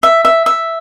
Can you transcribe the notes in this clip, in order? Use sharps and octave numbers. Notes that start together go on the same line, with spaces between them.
E5
E5
E5